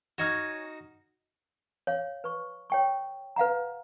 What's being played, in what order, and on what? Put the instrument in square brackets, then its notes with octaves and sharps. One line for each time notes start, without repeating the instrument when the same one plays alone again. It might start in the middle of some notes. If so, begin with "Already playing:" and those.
[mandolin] C#4 G#5 F6 [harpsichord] D#4 F#4
[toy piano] C#5 F5
B4 C#6
C#5 G5 C#6
B4 F5 F#5 A#5